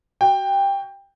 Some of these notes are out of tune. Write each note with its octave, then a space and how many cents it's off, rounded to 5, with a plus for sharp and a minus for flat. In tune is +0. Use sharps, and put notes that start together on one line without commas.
F#4 +30 G5 +15